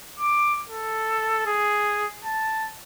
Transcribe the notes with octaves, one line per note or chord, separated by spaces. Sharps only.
D6
A4
G#4
A5